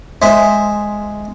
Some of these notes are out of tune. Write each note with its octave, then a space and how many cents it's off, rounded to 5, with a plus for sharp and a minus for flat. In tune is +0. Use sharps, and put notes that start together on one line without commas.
G#3 +0 C5 +0 E5 +0